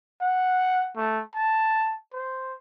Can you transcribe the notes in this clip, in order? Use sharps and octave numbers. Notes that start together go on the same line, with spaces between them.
F#5
A3
A5
C5